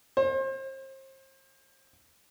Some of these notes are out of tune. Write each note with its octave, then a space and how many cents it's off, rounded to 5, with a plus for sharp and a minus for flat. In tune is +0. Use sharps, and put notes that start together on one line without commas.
C5 +35